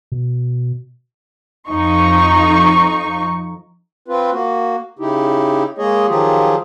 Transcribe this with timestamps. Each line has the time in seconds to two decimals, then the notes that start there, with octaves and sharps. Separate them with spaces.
0.12 B2
1.69 F2 F3 D#4 C#6
4.08 C4 F4 B4
4.32 A#3 F#4
4.99 C#3 D#4 E4 G4
5.78 G#3 A#3 G#4 C#5 D#5
6.08 D#3 F3 F#3 F4 G4 G#4